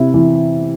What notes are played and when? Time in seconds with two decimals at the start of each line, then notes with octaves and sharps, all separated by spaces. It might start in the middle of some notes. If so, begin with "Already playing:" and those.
Already playing: C3 E4
0.14 E3